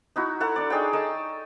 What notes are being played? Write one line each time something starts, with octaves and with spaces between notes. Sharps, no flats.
D#4 E4 F#4
E4 A4 F#5 A#5
D4 D5
D#4 G#4 C#5 G5
D#4 A4 A5 D#6